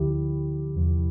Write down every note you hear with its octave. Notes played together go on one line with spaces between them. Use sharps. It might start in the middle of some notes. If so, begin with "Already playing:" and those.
Already playing: D2 D3 F3 E4 G4
E2 C3 F3